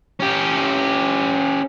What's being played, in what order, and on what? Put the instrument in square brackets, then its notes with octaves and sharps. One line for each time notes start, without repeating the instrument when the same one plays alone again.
[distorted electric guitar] C#4 G4